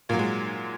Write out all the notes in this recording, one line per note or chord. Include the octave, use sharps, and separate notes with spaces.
A#2 F#3 A#3
G#3